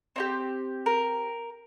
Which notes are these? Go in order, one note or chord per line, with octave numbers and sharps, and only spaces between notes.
C4 D#4 G4
A#4